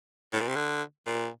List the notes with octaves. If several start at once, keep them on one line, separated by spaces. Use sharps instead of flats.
A2
A#2
C3
D3
A#2